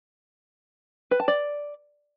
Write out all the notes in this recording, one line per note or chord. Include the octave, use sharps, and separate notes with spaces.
B4
A5
D5